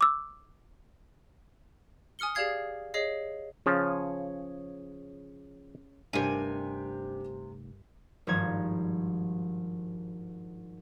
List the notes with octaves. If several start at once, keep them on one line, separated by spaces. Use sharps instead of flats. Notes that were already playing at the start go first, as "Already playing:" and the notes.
D6 E6
G#5 D#6 F6 C#7 G7
G4 G#4 D5 F5 G#6 C7
G#4 C#5 D#5 C7
C#3 F3 C#4 G#4 C#5
F1 G2 C3 D4 G4 A#4 G#5 F6
G#1 G2 F3 G3 A#5 G#6